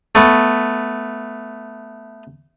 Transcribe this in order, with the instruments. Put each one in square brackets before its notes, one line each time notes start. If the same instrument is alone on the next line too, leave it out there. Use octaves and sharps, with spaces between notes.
[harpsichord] A3 B3